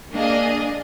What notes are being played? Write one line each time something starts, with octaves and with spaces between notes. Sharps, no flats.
A#3 D4 G#4 D#5